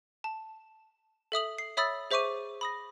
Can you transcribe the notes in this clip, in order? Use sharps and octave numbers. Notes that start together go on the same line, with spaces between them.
A5
A4 E5 D#6 F#7
C7
C#5 E5 B5 D#6 E6 A6
G#4 C5 E5 C#6 D6 D#7
B5 D#6 A#6